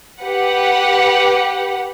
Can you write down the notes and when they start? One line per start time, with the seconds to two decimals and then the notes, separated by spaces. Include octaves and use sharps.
0.23 G4 B4 F#5